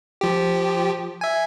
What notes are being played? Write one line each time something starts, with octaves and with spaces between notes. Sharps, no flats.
F3 G4
E5 G#5